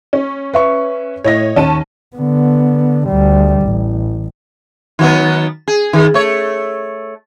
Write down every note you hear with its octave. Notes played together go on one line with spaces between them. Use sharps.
C#4
B4 E5 C#6
A2 C#5 D#5 A#6
D#2 C#4 A5 D#7
D3 B3
D2 G3
A1
D#3 F#3 B3
G#4
D#3
A3 C#5